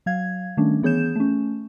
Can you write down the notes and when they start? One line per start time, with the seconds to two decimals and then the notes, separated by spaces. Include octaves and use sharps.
0.06 F#3 F5 G#6
0.57 D#3 G3 A3 C#4 D4
0.83 E3 B3 G#4 C#5 G6 E7
1.16 A3 C#4